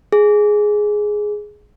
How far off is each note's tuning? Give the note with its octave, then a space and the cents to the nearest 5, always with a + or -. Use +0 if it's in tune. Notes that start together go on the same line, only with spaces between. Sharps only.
G#4 +5